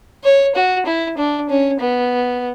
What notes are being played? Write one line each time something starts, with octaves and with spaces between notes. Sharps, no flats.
C#5
F#4
E4
D4
C#4
B3